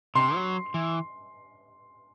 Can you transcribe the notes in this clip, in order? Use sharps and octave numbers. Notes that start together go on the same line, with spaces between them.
C3 C6
F#3
E3